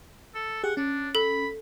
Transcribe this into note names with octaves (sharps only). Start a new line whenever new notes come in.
A4
G4 G#4 F#5
C#4 D4
A4 B5